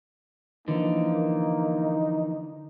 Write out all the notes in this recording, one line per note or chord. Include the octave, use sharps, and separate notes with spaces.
D3 E3 F3 A#3 D#4